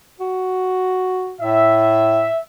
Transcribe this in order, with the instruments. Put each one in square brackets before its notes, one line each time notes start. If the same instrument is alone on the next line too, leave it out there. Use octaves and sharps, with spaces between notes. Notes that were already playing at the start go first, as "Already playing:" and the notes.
[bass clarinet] F#4
[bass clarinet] A2 [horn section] E5